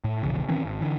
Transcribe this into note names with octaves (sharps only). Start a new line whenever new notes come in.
A2
E1 A#1 E2 C#3
D#3 E3 C4 C#4
G#1
D3 E3